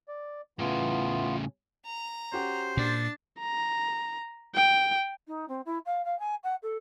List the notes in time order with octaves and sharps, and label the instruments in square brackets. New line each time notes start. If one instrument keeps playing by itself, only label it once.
[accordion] D5
[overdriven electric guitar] A2 C#3 [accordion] E3 B3 F4
[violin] A#5
[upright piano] C#4 F#4 G4 [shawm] C5
[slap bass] A#2 [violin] D4 A6
[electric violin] A#5
G5
[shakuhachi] D#4
C4
E4
F5
F5
G#5
F#5
A4